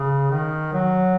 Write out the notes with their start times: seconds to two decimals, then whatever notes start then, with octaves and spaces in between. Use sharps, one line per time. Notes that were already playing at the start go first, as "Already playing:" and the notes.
Already playing: C#3
0.31 D#3
0.73 F#3